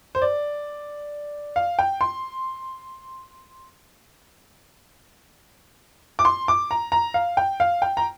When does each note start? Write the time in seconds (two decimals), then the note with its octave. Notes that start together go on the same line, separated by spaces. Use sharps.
0.15 C5
0.22 D5
1.56 F5
1.79 G5
2.01 C6
6.19 D6
6.25 C6
6.48 D6
6.71 A#5
6.92 A#5
7.14 F5
7.37 G5
7.60 F5
7.82 G5
7.97 A#5